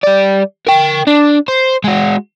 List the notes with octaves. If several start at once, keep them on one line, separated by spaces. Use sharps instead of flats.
G3 D5
A#4 G5
D4
C5
G#3 F#4